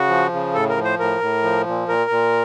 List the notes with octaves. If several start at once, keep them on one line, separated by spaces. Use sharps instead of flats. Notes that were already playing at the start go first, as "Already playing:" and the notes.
Already playing: C#3 F#4
F3
C#3
A2 A4
A#4
F3
C5
A2 A#4
A2
F3
A#2
A#2 A#4
A#2